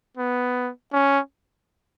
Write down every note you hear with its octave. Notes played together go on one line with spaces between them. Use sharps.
B3
C#4